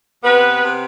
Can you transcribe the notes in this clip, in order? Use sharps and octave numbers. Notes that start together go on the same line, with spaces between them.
C3 B3 B4
C3